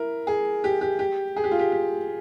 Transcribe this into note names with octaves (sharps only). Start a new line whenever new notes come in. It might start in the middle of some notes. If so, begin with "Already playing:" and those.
Already playing: E4 A#4
G#4
G4
G4
G4
G#4
G4
F4
G4
G4